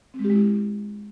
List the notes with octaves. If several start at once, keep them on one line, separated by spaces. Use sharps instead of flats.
C4
G#3
G4
G#3
E4